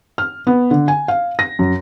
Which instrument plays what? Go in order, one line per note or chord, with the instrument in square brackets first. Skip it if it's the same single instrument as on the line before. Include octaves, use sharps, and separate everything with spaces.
[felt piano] F6
B3
D3
G#5
F5
A#6
F#2